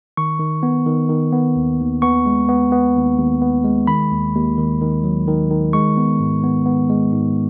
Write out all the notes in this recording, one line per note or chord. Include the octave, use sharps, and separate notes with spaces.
D#3 C#6
D#3
B3
D#3
D#3
B3
D#2
D#2
B3 C#6
G#3
B3
B3
D#2
D#2
B3
G#3
D#3 B5
D#2
D#2
D#3
D#3
F#3
D#3
D#3
G#3 C#6
B3
G#2
B3
B3
G#3
G#2